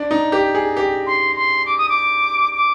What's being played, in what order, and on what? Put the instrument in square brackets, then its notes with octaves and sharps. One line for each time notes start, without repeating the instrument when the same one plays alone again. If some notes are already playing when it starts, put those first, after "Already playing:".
Already playing: [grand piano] D4
D#4
G4
G#4
G4
[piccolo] C6
C6
D6
D#6
D6
D6